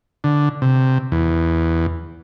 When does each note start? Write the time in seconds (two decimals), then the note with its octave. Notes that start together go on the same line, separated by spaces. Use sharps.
0.24 D3
0.62 C3
1.12 E2